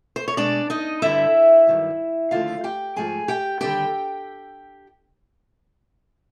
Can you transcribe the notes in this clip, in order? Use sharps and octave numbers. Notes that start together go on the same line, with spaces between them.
C5
C#5
B2 G#3 D4 D5
D#4 D#5
G2 D3 G3 E4 E5
G2 D#3 F#3
D#2 D3 F3 A3 F4 F5
G4 G5
G#2 F3 A3 G#4 G#5
G4 G5
D#2 D3 G3 G4 G5